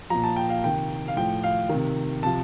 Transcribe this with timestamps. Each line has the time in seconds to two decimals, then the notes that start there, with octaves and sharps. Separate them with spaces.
0.10 F3 A#5
0.15 A#2
0.24 A5
0.36 G5
0.50 F5
0.64 C3 D#3 G5
1.08 F5
1.17 A2 F3 G5
1.43 F5
1.69 C3 D#3
2.23 C3 F3 A5